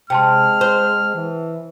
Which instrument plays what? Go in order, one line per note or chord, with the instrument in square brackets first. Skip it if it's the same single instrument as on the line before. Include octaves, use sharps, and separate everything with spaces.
[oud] C3 [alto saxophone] G#3 [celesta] G5 A5 C6 [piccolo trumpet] F6
[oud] C5
[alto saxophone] E3